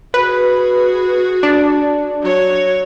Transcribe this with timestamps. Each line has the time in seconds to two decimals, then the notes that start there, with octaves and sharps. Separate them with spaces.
0.14 F#4 G#4 B4
1.43 D4
2.22 F#3 C#5